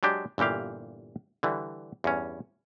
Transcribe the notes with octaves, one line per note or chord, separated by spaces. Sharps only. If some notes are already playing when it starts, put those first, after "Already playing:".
F#3 G#3 D4 G4
G1 A#2 E3 G4 F5
D3 E3 G3
E2 G2 C#4